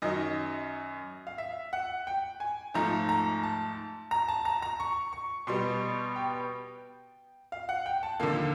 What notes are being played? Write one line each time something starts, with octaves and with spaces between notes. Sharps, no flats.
F#2 D#3 F#3 D#5
F5
E5
F#5
G5
G#5
G#2 F3 A3 A#5
A#5
A5
A#5
A5
A#5
A#5
C#6
C#6
B2 G3 B3 C6
G5
F5
F#5
G5
A5
D#2 D3 F3 A#3